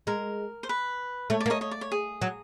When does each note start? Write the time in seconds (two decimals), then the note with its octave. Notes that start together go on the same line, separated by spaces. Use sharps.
0.07 G#3 A#4
0.63 C5
0.69 B4
1.30 A3 C#5
1.40 D5
1.46 A#3
1.50 C#5 D#5
1.61 C#5 D#5
1.71 D5
1.81 C#5
1.92 G#4
2.21 F#3